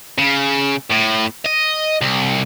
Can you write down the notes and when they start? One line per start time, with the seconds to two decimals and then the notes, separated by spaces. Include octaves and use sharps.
0.18 C#3
0.91 A2
1.45 D#5
2.02 C2